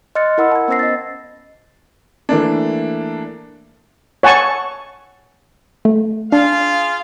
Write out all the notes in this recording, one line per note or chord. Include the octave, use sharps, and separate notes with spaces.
D#5 C6 F6 F#6 A6 C#7
E4 A#4 F#5 B5 E6
A5 G#6
B3 C#4 C5 E6 A#6 C7
D#5 A6
E3 A3 A#3 D4
C#5 F#5 G#5 A5 C#6
A3
D4 F4 G#4 F5